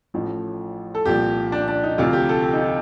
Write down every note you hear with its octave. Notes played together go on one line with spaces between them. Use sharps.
A1 A2 F3
A4
C2 A#2 F3 G4
D4
D4
D#4
D2 C3 F3 F4
G4
A4
G4
D#4
F4